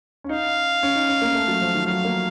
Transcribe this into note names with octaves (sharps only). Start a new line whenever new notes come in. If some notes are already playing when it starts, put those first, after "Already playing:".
C#4
D#4 F5
C#4
D#4
C#4
A#3
A3
F#3
F3
D#3
F#3 F5
A#3